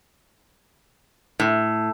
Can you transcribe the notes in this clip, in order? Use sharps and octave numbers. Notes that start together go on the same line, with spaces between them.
A2